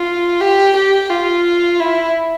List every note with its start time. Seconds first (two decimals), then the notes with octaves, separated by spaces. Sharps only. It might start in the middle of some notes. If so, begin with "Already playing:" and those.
Already playing: F4
0.41 G4
0.76 G4
1.10 F4
1.79 E4